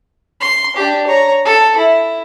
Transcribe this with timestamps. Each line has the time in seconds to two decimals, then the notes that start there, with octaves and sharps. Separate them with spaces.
0.41 C6
0.76 D4 G4
1.07 C#5 A#5
1.45 A4
1.77 E4